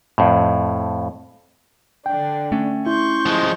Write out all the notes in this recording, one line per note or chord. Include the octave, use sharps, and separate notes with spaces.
F2 A2
D3 D4 G5
A3 C#4
E4 C6 C#6 G6
F3 G#3